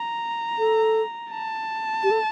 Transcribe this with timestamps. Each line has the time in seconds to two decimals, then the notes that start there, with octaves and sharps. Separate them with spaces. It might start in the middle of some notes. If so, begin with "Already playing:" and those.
Already playing: A#5
0.59 A4
1.31 A5
2.04 G4
2.11 A4